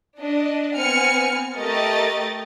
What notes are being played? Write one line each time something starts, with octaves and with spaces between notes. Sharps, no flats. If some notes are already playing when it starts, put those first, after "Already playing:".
D4 D#5
B3 C4 G#5 F6 C#7
A3 G4 A#4 D#5 A6